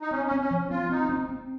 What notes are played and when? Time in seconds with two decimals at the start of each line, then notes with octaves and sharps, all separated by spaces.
0.02 D#4
0.11 C4 C#4
0.26 C#4
0.31 C4
0.40 C#4
0.51 F3
0.70 C4 F4
0.90 C4 D#4
1.09 C4
1.29 C4